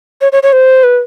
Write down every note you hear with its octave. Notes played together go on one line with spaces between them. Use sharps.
C#5
C#5
C#5
C5
B4